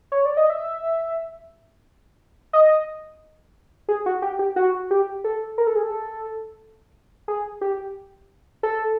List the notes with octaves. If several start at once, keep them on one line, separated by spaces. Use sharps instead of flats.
C#5
D5
D#5
E5
D#5
G#4
F#4
G4
G4
F#4
G4
A4
A#4
A4
G#4
A4
G#4
G4
A4